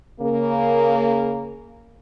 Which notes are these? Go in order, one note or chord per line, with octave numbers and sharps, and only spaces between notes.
C#3 A#3